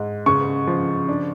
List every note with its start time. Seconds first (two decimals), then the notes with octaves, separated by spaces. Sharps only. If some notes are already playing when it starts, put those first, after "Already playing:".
Already playing: G#2
0.26 C#3 C#6
0.67 F3
1.09 D4